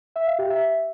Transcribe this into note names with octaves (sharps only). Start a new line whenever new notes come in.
E5
F5
G4
E5